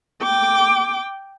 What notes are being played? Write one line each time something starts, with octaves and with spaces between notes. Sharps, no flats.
G5 D6